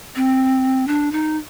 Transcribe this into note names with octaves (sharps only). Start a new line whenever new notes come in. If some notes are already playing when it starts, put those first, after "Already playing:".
C4
D4
D#4